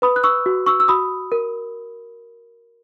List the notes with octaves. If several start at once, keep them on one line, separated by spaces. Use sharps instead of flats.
B4 B5 D#6
F#6
C#6 E6
F#4
C#6 E6
E6
F#4 B5 D#6
A#4